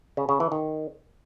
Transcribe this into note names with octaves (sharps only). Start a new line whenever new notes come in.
C#3
C#3
E3
D#3